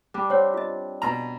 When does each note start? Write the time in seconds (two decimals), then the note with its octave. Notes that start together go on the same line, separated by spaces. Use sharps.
0.14 G3 D4
0.30 C4 C5 C#5 F#5
0.54 F4 D#5
1.02 B2 A#5